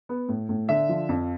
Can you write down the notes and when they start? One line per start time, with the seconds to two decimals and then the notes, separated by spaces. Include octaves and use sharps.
0.09 B3
0.28 A2
0.49 A2
0.69 D3 E5
0.89 F3
1.09 F2